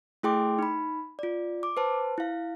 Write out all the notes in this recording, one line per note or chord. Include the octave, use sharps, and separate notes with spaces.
A3 E4 G#4 G5 C6 D6
D#4 B5
F4 D5
D6
B4 C5 A5
E4 F5